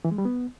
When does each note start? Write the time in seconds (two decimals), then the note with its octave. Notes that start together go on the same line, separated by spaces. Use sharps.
0.05 E3
0.11 G#3
0.18 G3
0.25 B3